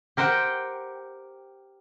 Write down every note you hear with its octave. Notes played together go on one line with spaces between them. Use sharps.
G4 A#4 C5 F#5 G5